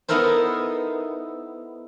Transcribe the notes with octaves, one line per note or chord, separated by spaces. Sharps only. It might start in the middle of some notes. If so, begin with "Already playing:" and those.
B3 D#4 E4 A4 A#4 C5